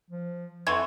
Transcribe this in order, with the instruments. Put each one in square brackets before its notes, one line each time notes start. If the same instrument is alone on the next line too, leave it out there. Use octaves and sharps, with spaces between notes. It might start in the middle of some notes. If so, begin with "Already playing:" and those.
[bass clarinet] F3
[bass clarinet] F2 [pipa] D3 E3 [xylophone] C6 C#6 G#6